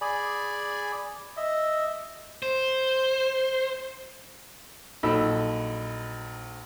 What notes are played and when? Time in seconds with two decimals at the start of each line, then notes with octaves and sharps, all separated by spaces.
0.01 G#4 D5 G#5 B5
1.37 D#5 E5
2.43 C5
5.03 A#1 F#3 D#4 A4 B5 E6